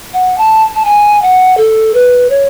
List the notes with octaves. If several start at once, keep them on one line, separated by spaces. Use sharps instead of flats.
F#5
A5
A5
G#5
F#5
A4
B4
C#5